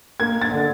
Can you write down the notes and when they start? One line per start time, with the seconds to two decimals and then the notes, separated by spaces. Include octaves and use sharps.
0.20 A#3 G#6
0.41 A6
0.52 D3